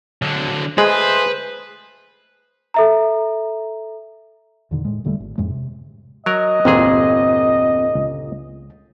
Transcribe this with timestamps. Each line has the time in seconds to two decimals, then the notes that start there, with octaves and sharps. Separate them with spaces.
0.22 D3 F#3
0.78 G#3 A3 G#4 B4 C5
2.74 A4 E5 A#5
4.71 E2 A#2 D3 D#3
4.85 A2 G#3
5.05 E1 D3 G3 A3
5.20 G#1
5.38 F2 A2 G#3
5.50 C3
6.26 F#3 A#4 D#5
6.65 G1 E2 A#2 C4 G#4
7.95 C#2